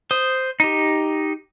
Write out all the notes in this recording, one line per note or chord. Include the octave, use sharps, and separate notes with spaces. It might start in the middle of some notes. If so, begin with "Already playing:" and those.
C5 D#6
D#4 G4